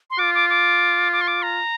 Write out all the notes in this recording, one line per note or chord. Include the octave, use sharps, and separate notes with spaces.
C6
F4 D6
D6
D6
D6
C6
D6
A#5